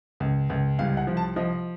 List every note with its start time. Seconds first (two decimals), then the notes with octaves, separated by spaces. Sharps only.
0.20 C#2
0.50 C#2
0.79 C2 F5
0.97 F#5
1.07 F3
1.17 A5
1.36 F3 D#5